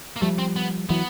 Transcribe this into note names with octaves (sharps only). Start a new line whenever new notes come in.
A#3
F3 G3 A3
C4
B3
E3 F#3 B3